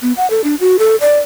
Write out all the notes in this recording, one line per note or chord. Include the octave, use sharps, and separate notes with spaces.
B3
F#5
A4
D4
F#4
A4
D5